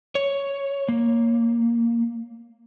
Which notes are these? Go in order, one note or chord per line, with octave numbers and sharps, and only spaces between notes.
C#5
A#3